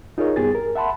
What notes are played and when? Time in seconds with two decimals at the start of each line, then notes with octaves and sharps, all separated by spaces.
0.18 D#4 F4 G#4 A#4 C#5 D#5
0.36 G2 B3 G4 G#4 A6
0.55 A#4
0.76 E5 F#5 A5 B5 C6